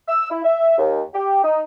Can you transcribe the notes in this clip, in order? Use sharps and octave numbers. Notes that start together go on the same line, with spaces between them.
E6
E4
E5
D#2
G4
D#4